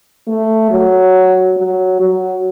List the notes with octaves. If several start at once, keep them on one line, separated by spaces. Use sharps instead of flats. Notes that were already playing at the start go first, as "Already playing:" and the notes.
A3
F#3
F#3
F#3